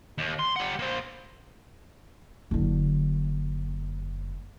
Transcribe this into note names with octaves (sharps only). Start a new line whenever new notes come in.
D#2
C6
G3 F#5
A#3 C5
F#1 D3